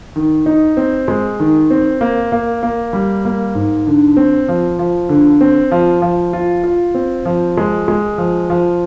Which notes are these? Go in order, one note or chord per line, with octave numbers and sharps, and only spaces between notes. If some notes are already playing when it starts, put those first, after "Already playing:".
D#3
D#4
C4
G#3
D#3
C4
A#3
A#3
A#3
G3
A#3
G#2
D3
C4
F3
F3
D3
C4
F3
F3
F4
F4
C4
F3
G#3
G#3
F3
F3